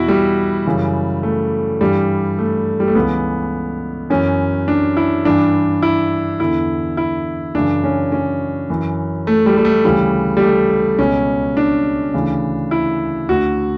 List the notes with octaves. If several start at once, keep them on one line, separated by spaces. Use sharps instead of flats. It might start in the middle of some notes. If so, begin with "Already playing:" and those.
Already playing: E2 B2 E4 F#4
G3
F#2 C#3 E3
A3
G2 E3 G3
A3
G3
A3
C#2 C#3 E3 B3
F#2 E3 C#4
D4
E4
G2 E3 D4
E4
E2 D3 E4
E4
F#2 C#3 E3 D4
C#4
C#4
F#2 E3
A3
G3
G3
A3
D2 C#3 E3 G3
G3
A3
C#2 B2 C#4
D4
D2 C#3 E3
E4
D2 D3 F#4